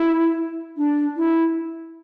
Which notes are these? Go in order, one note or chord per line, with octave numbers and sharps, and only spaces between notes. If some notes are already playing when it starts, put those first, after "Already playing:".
Already playing: E4
D4
E4